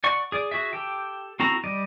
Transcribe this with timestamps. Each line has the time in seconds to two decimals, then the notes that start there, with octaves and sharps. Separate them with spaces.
0.04 D5 F#5 C#6
0.32 G#4 D5
0.51 F#4 G#4 E5
0.73 G4 A4 G5
1.40 C4 E4 F#4 A4 A#5
1.64 G3 D5 D#5